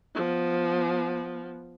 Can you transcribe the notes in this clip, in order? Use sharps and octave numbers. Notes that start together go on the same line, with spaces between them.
F3 B3